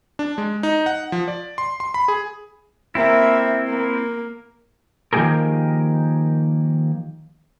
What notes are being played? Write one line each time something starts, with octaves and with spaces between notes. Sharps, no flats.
D4
G#3
D#4
F#5
F3
D5
C6
C6
B5
G#4
A#3 C4 E4 E5
A#3
D#3 F3 A#3 G4 G#4 A#4